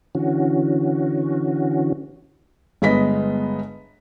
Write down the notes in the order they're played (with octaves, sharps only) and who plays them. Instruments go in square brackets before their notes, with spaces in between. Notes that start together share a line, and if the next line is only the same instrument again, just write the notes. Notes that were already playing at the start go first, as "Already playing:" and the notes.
[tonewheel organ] D3 E3 C#4 F#4
[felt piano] G1 G#3 B3 D#5 B6